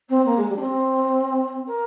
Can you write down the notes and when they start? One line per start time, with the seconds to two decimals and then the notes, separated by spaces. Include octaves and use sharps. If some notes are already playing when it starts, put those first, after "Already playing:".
0.09 C4
0.25 A#3
0.37 G#3
0.49 G3
0.55 D4
0.60 C4
1.67 A#4